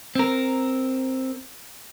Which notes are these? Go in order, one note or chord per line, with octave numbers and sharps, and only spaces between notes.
C4 A#4